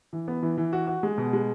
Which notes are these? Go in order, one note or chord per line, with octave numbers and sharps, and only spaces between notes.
E3
B3
E3
E3
F#4
F#4
G#3
B2
G#3